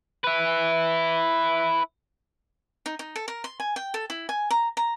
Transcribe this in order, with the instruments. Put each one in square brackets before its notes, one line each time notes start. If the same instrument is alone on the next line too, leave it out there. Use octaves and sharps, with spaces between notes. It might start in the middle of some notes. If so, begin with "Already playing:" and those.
[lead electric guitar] E4 B4
[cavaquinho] D#4
D#4
A4
A#4
C6
G#5
G5
A4
E4
G#5
A#5
A#5